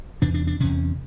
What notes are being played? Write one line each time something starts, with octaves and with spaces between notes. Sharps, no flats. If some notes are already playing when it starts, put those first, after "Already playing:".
E2 C3 D4
D4
D4
E2 C3 C#4